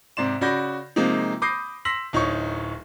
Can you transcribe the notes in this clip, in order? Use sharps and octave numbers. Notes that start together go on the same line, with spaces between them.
G#2 C3 D5 C6 E7
C#3 F#4 D5 B5 G6 A#6
C3 F3 G#3 A#3 C4 D#4
B5 D6 D#6 G6 A#6 C7
C6 E6 A#6 B6 F#7
D1 D#4 C#5 C#6